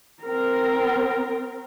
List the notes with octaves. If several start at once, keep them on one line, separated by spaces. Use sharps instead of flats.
C4 A#4